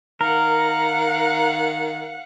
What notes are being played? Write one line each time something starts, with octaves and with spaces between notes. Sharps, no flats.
D#3 A#4 F5 F#5